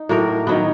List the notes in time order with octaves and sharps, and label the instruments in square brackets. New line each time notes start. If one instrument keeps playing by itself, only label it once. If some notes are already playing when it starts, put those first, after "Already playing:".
Already playing: [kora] D#4
A2 F#3 A#3 A#4
D#3 F#3 B3